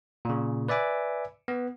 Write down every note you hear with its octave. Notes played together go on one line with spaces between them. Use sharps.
A#2 C#3
B4 D5 E5 G#5 D6
B3